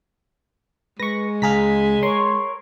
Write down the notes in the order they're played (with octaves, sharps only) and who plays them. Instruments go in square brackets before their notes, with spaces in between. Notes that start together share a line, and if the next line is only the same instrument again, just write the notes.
[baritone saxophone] G#3 [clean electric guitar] B4 [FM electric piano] C#6 A#6
[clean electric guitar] C#2 F5 [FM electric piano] G#4 A#5 B6
[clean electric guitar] A#4 [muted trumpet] C#5 [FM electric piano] C6